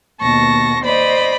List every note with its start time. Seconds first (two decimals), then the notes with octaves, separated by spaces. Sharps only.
0.21 D#2 B2 A5 C#6 A#6
0.83 C5 D5 D#5 B5